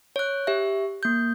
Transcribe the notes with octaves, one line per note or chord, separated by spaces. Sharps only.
C#5 F#6
G4 E5
A#3 G6